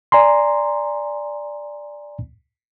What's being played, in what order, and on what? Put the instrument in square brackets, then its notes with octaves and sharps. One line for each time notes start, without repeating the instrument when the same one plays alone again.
[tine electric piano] D5 G#5 A#5 C6